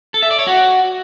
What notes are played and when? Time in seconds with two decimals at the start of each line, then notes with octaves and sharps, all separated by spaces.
0.14 A4
0.22 E5
0.31 D5
0.39 C#5
0.47 F#4